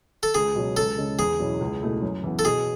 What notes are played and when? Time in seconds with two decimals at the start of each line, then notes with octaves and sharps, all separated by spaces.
0.23 A4
0.35 C#2 G#4
0.55 B2 F#3 C#4
0.77 C#2 A4
0.98 C#3 G#3
1.19 E2 G#4
1.39 B2 F#3 C#4 E4
1.60 C#2
1.82 B2 A3 E4
2.02 F#2
2.24 E3 B3
2.39 A4
2.45 B2 G#4